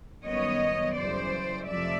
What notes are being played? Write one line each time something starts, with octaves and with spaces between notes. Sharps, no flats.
F#2 D#3 G3 B3 C#5 D#5
F#2 C#3 E3 G3 C5 D5
F2 C3 F3 A3 D5 E5